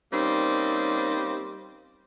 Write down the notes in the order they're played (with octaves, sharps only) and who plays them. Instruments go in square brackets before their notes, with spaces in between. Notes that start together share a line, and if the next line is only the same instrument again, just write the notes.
[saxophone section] G3 A#3 C4 C#4 D#4